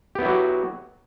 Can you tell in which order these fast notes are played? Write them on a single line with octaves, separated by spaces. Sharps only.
G4 B3 E4 F#3 F#4